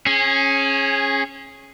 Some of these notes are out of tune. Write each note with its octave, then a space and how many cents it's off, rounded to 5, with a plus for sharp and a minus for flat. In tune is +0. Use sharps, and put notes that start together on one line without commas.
C#4 -20 G#4 +5